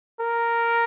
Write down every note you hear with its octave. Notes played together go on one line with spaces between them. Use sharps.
A#4